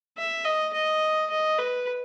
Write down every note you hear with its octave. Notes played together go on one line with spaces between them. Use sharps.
E5
D#5
D#5
D#5
B4